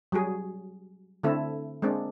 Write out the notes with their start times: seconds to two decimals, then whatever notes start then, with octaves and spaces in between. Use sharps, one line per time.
0.12 F#3 G3 F#4 G#4
1.23 D3 A3 C4 E4 A4
1.82 G#3 A#3 C4 D4